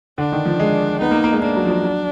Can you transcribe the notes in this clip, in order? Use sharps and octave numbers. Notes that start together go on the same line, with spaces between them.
D3 D4
D#3
F3
G#3
B3 D#4
A#3
A#3
G#3
A#3 D4
F#3
F3
F#3
F#3